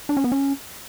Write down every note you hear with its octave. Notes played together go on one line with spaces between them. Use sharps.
D4
C#4
B3
C#4